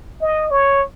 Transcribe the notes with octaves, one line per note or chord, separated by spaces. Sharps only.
D#5
C#5